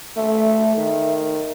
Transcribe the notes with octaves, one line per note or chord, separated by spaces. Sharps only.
A3 E5
D#3